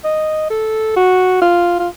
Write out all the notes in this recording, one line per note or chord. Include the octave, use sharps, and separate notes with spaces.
D#5
A4
F#4
F4
F4